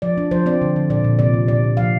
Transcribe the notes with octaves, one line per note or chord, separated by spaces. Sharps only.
F3 D5
D4
F3 C5
C4 D5
D3
D3
A#2 D5
A#2
C3 D5
C3
A#2 D5
A#2
F3 F5